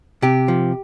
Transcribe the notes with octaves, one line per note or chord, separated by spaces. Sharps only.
C3 G4
F3